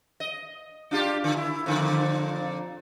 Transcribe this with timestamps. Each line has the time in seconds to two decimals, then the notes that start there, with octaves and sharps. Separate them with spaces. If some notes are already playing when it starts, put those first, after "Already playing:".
0.20 D#5
0.91 D4 F4 G4
1.24 D3
1.37 E4
1.66 F2 A#2 D3